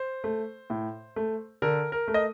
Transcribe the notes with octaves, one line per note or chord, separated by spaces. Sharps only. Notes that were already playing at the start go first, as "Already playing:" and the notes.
Already playing: C5
A3
A2
A3
D3 A#4
A#4
A3
D#5